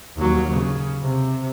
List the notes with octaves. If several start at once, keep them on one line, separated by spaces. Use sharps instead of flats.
D#2 F#3
C#3
C3